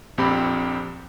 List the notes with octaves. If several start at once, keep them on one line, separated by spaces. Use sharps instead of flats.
A#1 F2 C4 G4 B5